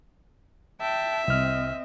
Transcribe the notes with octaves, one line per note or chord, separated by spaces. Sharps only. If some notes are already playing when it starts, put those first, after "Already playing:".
E5 G5 A5
C2 C4 D#5 F6